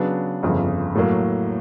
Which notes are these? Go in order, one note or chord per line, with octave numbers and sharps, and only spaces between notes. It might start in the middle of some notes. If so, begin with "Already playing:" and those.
Already playing: C#3 F#3 B3 D4
G1 F2 C#3
A2 F#3 A#3